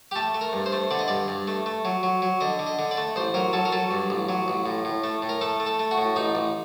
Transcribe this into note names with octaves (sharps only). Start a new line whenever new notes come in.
G4
A3 A4
A3
A#4
G2
C5
A3
D3 D5
D#5
G2 D5
G2
A3
A3
F#3
F#3
F#3
D3 D#5
D3
D#5
D3
D5
A3
A1 C5
F#3 A#4
F#3 A4
A#4
F#3 A4
G2
A1
F#3
A1
A2
A2
A3
A2
A#4
A3 A4
A3
A4
A3
F#4
A2
A1 D#4
A1